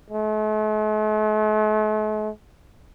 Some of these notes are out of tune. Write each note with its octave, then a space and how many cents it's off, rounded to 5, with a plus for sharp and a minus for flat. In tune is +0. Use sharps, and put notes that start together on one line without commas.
A3 -45